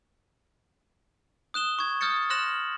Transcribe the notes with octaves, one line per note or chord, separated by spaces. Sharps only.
D#6 F#6 E7 G7
C#6 G#6
D#6 F6 G6 A6 C#7
C6 F6 F#6 A#6 E7 F#7